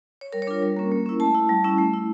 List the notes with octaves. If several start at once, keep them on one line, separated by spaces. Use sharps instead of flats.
C#5
G3 A#4
C#5
D4 F4 A#4
G3
A#3 C#4
A#3
C#4 E4
A3 A5
E4
G3
C#4 E4
A3
E4